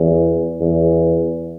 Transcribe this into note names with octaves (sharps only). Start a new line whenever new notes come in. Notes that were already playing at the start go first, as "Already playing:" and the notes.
Already playing: E2
E2